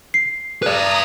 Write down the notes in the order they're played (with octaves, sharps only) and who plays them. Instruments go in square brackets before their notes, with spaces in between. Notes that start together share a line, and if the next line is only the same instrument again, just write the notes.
[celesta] C7
[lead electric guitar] B4 D5 [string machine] A#5 D#6